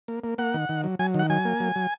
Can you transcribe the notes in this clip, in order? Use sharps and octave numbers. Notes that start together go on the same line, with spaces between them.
A#3
A#3
A#3 F#5
D#3
D#3
F#3
F#3 G#5
D#3
F#5
F#3 G#5
A#3
F#3
F#3